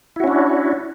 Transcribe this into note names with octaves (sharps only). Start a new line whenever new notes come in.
C#4 D4 E4 F#4